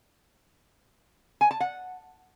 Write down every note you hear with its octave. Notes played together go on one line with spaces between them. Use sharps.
G#5
A5
F#5